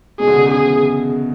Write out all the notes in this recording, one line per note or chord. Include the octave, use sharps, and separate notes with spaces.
B2 G#4
D3
C#3
C#3
D3 G#4
E3